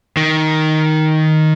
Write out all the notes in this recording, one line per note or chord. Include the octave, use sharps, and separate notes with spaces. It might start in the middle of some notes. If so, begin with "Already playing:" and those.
D#3